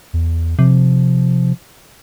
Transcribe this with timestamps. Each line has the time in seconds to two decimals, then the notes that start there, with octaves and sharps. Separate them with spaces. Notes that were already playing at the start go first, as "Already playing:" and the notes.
0.13 E2
0.59 C3 F3